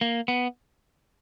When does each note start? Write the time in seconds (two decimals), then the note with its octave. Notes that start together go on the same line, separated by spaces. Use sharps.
0.01 A#3
0.28 B3